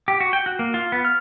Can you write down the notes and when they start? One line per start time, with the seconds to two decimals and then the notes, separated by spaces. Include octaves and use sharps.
0.08 G4
0.20 F#4
0.33 G5
0.46 F#4
0.59 A#3
0.74 F4
0.92 B3
1.05 F6